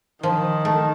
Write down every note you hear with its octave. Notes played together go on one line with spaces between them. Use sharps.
D#3 F3
A3